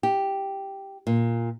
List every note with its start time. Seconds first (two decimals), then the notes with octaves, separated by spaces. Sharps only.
0.03 G4
1.07 A#2